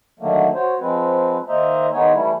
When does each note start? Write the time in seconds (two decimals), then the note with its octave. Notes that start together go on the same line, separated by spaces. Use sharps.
0.20 D3 D#3 F#3 A3 A#3
0.54 F#4 C5 C#5
0.80 F3 G#3 C4 B4
1.48 D#3 A#3 C5 D#5 E5 A#5
1.93 D#3 G#3 B3 D#4 C#5 G#5
2.13 E3 G3 A3 E4